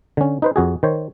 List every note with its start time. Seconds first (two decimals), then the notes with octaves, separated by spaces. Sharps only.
0.17 D3 C#4
0.42 D#4 B4 C5
0.56 F2 F#4 G#4
0.83 D#3 C5 C#5